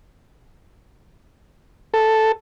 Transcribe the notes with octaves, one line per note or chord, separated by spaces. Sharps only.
A4